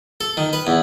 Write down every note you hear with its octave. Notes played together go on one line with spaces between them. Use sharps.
A4
D#3
B4
E2